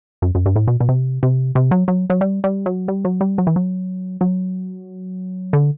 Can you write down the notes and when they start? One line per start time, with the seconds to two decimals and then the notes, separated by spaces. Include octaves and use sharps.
0.22 F#2
0.35 F#2
0.46 G2
0.56 A2
0.68 B2
0.81 B2
0.89 C3
1.23 C3
1.55 C3
1.71 F#3
1.88 F#3
2.10 F#3
2.21 G3
2.44 G3
2.66 F#3
2.88 G3
3.05 F#3
3.21 G3
3.38 F#3
3.47 E3
3.56 F#3
4.21 F#3
5.53 D3